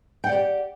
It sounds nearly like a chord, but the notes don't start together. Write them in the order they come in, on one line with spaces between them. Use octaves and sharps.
G5 F#5 D5 G4